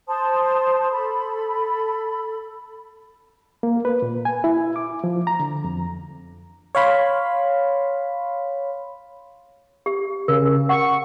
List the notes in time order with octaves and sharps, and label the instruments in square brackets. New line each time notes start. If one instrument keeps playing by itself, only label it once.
[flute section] C5 A5 C6 D#6
A4 B5
[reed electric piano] A#3
B4
A#2
G#5
E4
D6
F3
A#5
D3
F2
[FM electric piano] C#5 F5 B5 C6
[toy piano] G4
[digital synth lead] C#3 [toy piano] A#4
[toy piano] F#5 [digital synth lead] C#6